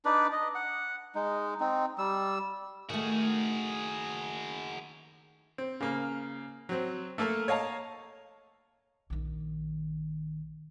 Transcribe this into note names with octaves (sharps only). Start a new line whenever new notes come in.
D4 D#4 B4 D5
D#5
F#5
G#3 D#4
C4 D#4
G3 E6
D#3 A3 F#4 G#4
C4
C#3 A#3
F#3 C4
A3 A#3 A4 A#4
C#5 D#5 F5 A5 A#5
A#1 D#3